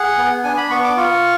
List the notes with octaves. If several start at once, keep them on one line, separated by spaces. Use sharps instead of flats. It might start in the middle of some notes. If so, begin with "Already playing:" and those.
Already playing: G#4 F#5
B3
D4 G#5
B5
B3 C#6
D6
F4 C#6